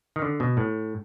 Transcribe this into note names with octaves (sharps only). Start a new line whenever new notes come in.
D#3
D3
B2
A2